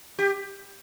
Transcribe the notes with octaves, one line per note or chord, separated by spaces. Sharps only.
G4